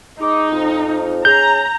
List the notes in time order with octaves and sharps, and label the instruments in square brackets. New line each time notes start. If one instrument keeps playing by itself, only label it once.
[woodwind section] G#3 D6 [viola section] D#4
[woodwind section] F2
[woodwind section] C#4 G#4 [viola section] A#5 [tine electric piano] G6